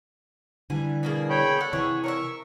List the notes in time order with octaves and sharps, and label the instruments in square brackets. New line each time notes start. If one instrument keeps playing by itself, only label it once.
[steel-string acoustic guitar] D3 E3 G3 [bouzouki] G#5
[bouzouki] B2 A#3 G#4
[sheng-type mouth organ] C#5 G5 B5
[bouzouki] D4 A4 [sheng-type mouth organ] F#5
[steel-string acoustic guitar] C3 E3 [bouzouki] G#4 C#5
[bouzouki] A#4 C#5 E5 [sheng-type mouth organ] C#6